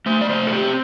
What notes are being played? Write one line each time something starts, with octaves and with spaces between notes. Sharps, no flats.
A3 C5
D5
C3 C5
A4
C4 G4